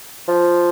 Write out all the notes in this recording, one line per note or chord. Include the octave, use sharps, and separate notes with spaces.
F3